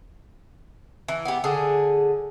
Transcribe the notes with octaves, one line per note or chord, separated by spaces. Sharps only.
E3
B3 G4
D3 G#4